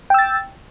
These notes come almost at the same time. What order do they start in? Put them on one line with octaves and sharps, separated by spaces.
G5 E6 A6